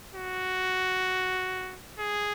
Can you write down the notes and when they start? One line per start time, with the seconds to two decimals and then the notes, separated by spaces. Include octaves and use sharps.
0.14 F#4
1.99 G#4